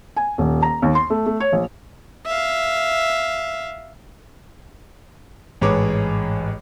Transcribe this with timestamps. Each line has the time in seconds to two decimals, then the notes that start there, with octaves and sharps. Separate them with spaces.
0.16 G#5
0.38 D#1
0.62 A#5
0.82 D#2
0.95 C6
1.10 A3
1.26 A3
1.40 C#5
1.52 A#1
2.26 E5 F5
5.61 A1 G#2 G#4 B4 C#5 D6